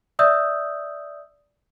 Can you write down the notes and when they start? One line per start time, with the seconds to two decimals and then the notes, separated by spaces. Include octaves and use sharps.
0.19 D5 E5 D#6 E6 G6